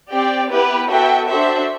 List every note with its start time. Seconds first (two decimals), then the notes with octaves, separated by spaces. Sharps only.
0.10 C4 G4 D5 G5
0.50 B3 E4 G4 B4
0.89 B3 F#4 A4 E5 G5
1.28 D4 F#4 A4 C5 E5